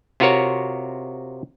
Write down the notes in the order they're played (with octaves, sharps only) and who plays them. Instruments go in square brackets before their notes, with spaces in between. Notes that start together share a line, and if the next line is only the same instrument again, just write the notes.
[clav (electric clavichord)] C3 F4 F#4 A#4 C#5